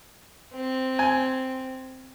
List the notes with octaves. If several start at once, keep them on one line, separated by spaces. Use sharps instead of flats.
C4
G#5